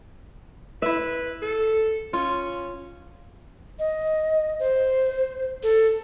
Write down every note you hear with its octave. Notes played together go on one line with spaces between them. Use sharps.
E4 B4 E5
A4
C#4 F4
D#5
C5
A4